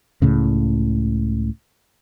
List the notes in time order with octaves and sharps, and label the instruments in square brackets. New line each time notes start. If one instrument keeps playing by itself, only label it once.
[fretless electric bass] C#2 A2 C#3